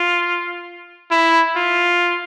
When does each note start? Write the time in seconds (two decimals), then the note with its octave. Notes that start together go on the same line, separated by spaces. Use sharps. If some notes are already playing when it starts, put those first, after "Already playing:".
Already playing: F4
1.11 E4
1.56 F4